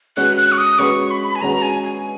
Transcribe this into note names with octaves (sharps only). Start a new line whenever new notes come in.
G#3 C#4 F#4 B4 F#6
F#6
C#6
D#6
G#3 C#4 F#4 B4 C#6
B5
G#5
G#3 C#4 F#4 B4 A#5
G#5
G#5